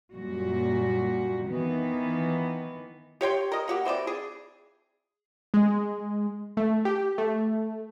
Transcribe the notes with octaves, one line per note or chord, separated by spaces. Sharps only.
F#2 A#2 G3 F#4
D#3 E3 B3
G4 C#5 G5 C6
A#4 D#5
A#3 F#4 G4
E3 C4 C5 D5
G#4
G#3
A3
G4
A3